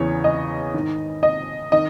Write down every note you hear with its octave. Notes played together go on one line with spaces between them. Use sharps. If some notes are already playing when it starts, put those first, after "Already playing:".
Already playing: E2 C#3 E3 C#5
D#5
G#2 D#3
D#5
D#3 D#5